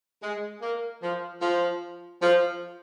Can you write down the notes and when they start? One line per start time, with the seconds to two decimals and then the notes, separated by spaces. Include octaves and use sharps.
0.22 G#3
0.62 A#3
1.02 F3
1.41 F3
2.22 F3